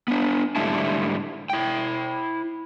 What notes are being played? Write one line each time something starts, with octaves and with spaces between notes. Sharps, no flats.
B3 D4
G#2 D3 G3 A3 E4 A5
E4 G5